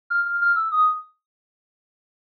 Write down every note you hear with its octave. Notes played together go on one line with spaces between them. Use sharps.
F6
F6
F6
E6
D#6